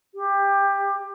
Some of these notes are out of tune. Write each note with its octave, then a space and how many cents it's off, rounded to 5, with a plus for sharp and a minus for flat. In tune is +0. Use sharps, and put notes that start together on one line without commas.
G4 +20